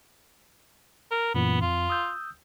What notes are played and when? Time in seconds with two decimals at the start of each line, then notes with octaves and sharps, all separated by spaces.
1.11 A#4
1.35 F#2 A#2 E3 B3
1.61 F2 F4
1.90 D#6 E6 G6